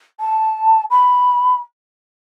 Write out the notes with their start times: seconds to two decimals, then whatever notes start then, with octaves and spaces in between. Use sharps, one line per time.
0.20 A5
0.91 B5